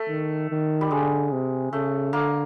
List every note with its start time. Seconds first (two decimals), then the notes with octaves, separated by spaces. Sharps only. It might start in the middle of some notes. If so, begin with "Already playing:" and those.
Already playing: A3
0.09 D#3
0.50 D#3
0.81 G3
0.91 D3 G#3
1.32 C3
1.72 C#3 A3
2.13 D3 A#3